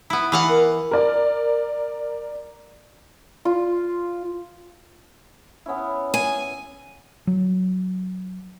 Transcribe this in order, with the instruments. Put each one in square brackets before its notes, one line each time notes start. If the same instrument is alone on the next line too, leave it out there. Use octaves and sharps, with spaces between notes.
[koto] B3 E4
E3 F5 F#5
[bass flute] A#4
[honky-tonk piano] A#4 D5
[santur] F4
[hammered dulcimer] B3 C#4 E4
[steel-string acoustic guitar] G#5
[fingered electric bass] F#3